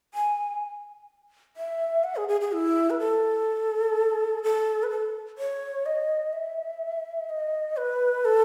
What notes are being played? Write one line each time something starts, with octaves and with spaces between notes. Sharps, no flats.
G#5
E5
F#5
G#4
G#4
G#4
E4
B4
A4
A4
B4
A4
C#5
D#5
E5
D#5
B4
A4